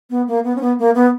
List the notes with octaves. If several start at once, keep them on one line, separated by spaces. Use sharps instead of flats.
B3
A#3
B3
C#4
B3
A#3
B3